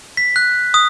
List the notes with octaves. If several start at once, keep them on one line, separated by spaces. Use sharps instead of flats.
B6
F#6
D#6